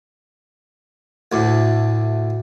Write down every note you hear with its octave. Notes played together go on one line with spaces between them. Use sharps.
D2 A2